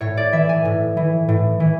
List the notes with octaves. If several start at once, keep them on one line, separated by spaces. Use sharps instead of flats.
A2 C#5
D5
E3 E5
G#5
A2
E3
A2
E3